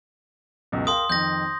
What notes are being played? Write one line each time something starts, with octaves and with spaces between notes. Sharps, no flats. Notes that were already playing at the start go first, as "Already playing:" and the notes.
C#2 F#2 B2
A#4 F5 G5 C6 D#6
F2 D#3 G6 A#6